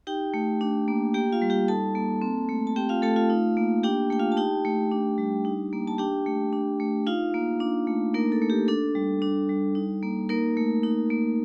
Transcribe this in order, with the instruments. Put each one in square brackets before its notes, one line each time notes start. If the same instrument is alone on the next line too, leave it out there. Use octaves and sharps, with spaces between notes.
[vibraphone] D#4 G4 G5
A3
D4
A#3
A#3 G4 G5
F4 F5
G3
G4 G5
D#4 A4 A5
A#3
C4
A3
A5
C4 G4 G5
F4 F5
A3 A4 A5
F4 F5
D#4
A#3
D4 G4 G5
A3 G5
F4 F5
A5
D#4 G4 G5
A3
D4
G3
D#4
A#3
A5
D4 G4 G5
A3
D4
A3
D#4 F4 F5
A#3
D4
A3
A#3 D#4 A#4
A4
A3
G4
D4 A4
G3
D4
G3
D#4
A#3
A#3 D#4 A#4
A3
D#4
A#3